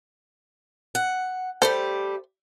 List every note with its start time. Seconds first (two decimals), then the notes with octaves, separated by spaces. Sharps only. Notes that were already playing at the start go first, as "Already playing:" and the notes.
0.95 F#5
1.62 G3 A3 G4 A4 C5